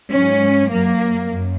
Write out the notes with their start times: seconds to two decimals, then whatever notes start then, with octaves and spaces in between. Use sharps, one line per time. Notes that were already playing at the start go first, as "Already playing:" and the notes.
0.13 G#2 F#3 C#4
0.71 F#2 F#3 A#3
1.28 F#2